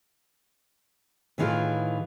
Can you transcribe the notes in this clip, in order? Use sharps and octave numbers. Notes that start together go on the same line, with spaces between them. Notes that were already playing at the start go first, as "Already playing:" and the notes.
A2 D#3 E3 D#4 F4 G#4